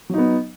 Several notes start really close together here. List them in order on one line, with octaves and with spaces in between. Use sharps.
F#3 D#4 B3